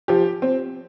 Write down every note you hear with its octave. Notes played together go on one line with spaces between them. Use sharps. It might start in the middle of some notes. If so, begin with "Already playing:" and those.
F3 G4
C4